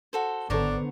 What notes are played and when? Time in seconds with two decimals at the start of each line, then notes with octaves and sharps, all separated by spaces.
0.13 F#4 A4 C5
0.50 G#1 D3 B3 D4 A4 C5 C#5 A#5